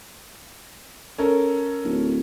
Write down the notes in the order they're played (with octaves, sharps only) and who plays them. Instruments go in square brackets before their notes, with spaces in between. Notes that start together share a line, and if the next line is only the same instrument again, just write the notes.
[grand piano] C#4 A4 A#4
[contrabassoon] D1